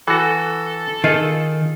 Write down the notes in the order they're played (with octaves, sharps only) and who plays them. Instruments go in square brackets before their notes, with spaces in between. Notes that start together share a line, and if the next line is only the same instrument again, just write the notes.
[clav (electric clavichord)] E3 F#4 [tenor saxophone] A4
[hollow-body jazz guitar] D#3 [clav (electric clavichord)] F4 G#4